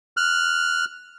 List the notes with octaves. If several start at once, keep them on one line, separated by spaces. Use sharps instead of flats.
F6 F#6